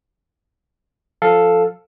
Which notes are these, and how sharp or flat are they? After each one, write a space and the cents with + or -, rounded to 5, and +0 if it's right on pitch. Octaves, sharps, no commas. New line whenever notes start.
F3 +0 A4 +0 F5 +0